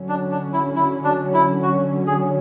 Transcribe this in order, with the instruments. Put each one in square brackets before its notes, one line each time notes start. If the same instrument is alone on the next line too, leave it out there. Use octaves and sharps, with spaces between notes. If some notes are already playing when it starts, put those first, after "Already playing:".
Already playing: [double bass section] D3 F#3 C#4
[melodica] D4
D4
E4
E4
D4
E4
F#4
G#4